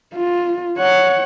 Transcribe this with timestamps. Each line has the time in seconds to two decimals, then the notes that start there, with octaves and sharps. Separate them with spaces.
0.15 F4
0.78 C#5 F#5